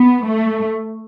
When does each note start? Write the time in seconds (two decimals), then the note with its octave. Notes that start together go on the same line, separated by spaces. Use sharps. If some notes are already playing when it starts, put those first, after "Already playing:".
Already playing: B3
0.25 A3